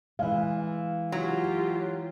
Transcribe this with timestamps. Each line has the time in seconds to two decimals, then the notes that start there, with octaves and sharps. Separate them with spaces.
0.19 E3 G#3 F5
1.12 F#3 F4 G4